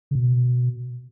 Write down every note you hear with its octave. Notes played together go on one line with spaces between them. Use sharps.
C#3
B2